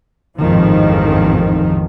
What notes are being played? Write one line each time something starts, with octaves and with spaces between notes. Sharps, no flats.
A1 F2 G#2 D#3 F3